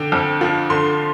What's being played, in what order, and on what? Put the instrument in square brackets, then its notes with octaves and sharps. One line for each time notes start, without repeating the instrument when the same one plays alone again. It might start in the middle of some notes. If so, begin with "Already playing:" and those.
Already playing: [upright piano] D3 G5
F2
F3
D3 C6